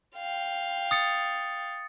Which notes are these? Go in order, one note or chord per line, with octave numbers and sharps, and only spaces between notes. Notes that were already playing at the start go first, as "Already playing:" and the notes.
F5 G5
D#6 A6 C#7